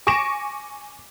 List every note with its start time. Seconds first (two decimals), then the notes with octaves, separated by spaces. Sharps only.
0.07 G#5 C#6 D6 A#6 D7 E7